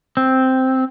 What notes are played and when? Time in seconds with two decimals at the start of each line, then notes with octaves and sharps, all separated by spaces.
0.17 C4